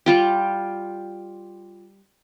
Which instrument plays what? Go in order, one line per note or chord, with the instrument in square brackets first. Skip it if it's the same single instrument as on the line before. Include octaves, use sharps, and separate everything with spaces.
[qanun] G3 F4 G4